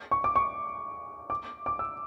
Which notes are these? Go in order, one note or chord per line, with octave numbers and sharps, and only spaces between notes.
C#6
D6
C#6
D6
D6
E6